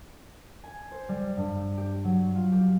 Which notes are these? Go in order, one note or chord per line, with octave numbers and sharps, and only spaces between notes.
G#5
C5
G3
G2
G4
F#3
F4
G4